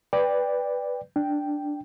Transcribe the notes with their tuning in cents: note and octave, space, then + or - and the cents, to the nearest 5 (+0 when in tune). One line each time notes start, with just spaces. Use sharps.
B4 +0 D5 +0 G5 +20
D4 +0 G5 +0